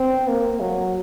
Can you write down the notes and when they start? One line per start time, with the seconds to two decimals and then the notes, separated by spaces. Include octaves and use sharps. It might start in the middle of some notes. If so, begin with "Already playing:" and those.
Already playing: C4
0.28 A#3
0.60 F#3